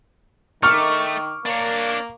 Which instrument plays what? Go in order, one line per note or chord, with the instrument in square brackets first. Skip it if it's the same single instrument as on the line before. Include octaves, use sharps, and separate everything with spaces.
[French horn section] D#3 [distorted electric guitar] A3 [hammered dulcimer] C#6 D6 [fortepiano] F6
[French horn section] A#3 [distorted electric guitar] D4 C#5